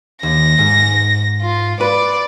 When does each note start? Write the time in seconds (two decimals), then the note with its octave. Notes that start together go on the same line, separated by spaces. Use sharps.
0.23 D#2 A#6
0.59 G#2
1.42 F4
1.81 B4 D5